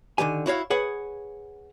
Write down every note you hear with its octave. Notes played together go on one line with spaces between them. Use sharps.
D3 D#3 G4 G#5
E4 F#4 C#5 F5
G#4 B4 C#5 F#5